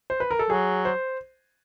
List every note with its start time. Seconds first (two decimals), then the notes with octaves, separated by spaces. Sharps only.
0.10 C5
0.20 B4
0.31 A#4
0.39 A4
0.50 F#3 G#4
0.85 C5